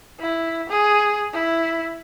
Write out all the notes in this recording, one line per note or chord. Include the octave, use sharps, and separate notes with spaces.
E4
G#4
E4